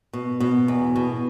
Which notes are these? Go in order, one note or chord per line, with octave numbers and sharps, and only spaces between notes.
B2
B2
E2
B2